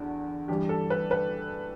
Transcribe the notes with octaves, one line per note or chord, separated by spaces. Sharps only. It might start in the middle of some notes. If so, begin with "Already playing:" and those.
Already playing: E2 D3 F#4
G2 E3 G3 G4
A4
B4
B4